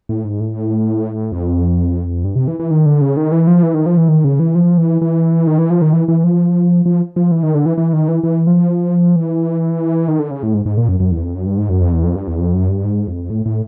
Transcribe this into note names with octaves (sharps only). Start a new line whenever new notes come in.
A2
G#2
A2
F2
G2
C3
E3
E3
D#3
D3
C#3
D#3
E3
F3
E3
D#3
F3
E3
D#3
C#3
E3
F3
E3
E3
D#3
E3
F3
D#3
E3
E3
F3
F3
F3
E3
D#3
D3
E3
E3
D#3
E3
E3
F3
E3
D#3
D3
C#3
A2
G#2
G#2
A#2
F#2
F#2
E2
F2
F#2
G2
G#2
F#2
F2
E2
F2
G2
E2
F2
F#2
G2
G#2
F2
A2
A2